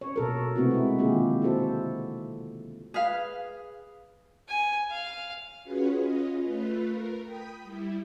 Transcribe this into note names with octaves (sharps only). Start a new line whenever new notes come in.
C#5
B2 A4 A#4
C3 A3 B3 C4 E4 F#4
G#3 E4
D3 D#3 A#3 F4 G4 G#4
E4 F#4 A4 C5
G#4 B4 F5
G#5
F5
C#4 F4 F#4 G#4 B4 C#5
C#4 F4 D#5
A3 F4 B4
A#4
G5 B5 D#6
G3 E4